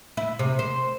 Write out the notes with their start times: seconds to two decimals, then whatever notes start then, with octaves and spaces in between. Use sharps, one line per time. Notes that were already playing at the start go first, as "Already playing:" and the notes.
0.17 E4
0.39 C3
0.59 C5